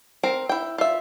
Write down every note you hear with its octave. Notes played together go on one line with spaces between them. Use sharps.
C4 A#4
E4 G5
F4 E5